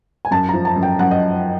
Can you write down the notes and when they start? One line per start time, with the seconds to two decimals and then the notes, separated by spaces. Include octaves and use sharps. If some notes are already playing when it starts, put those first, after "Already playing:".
0.25 G#5
0.31 F#2 A5
0.49 F3 A#5
0.65 A5
0.76 F#2
0.83 G5
0.99 F#2 F#5
1.11 D#5